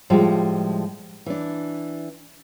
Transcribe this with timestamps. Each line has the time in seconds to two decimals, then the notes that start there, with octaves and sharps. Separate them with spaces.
0.10 A2 F3 G3 G#3
1.26 E3 D4